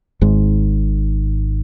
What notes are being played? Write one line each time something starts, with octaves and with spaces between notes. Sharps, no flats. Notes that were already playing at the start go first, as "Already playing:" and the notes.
G#1 G#2